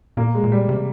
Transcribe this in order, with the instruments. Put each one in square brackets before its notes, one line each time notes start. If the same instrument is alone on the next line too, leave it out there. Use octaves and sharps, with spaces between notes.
[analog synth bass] A#2 [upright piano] A#3
[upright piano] G#3
[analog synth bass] A#2
[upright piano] G3
[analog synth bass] C3